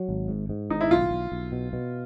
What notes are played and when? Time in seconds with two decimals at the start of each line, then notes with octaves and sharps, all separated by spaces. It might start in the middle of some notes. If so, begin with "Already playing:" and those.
Already playing: F#3
0.09 G#1
0.28 G#2
0.49 G#2
0.70 G#1 D#4
0.81 E4
0.91 B1 F4
1.11 B1
1.32 B1
1.52 B2
1.73 B2